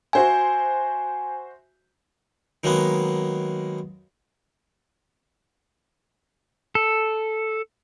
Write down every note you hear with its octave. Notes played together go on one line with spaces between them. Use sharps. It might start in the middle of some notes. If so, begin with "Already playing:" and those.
F#4 C5 E5 G#5
D#3 F#3 G#3 A#3 B3
A4